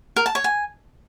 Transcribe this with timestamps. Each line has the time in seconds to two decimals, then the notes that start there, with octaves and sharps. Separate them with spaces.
0.16 A#4
0.26 A5
0.35 C#5
0.44 G#5